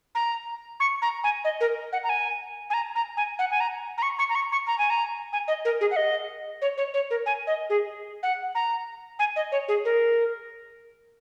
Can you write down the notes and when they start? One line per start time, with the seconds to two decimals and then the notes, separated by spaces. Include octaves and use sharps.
0.15 A#5
0.80 C#6
1.02 A#5
1.24 G#5
1.45 D#5
1.61 A#4
1.93 F#5
2.04 A#5
2.09 G#5
2.70 G#5
2.74 A#5
2.95 A#5
3.17 G#5
3.39 F#5
3.51 G#5
3.60 A#5
3.98 A#5
4.02 C#6
4.19 C#6
4.29 A#5
4.35 C#6
4.52 C#6
4.67 A#5
4.79 G#5
4.90 A#5
5.33 G#5
5.48 D#5
5.65 A#4
5.81 G#4
5.91 F#5
5.96 D#5
6.62 C#5
6.78 C#5
6.94 C#5
7.11 A#4
7.26 G#5
7.47 D#5
7.70 G#4
8.23 F#5
8.55 A#5
9.19 G#5
9.36 D#5
9.52 C#5
9.68 G#4
9.85 A#4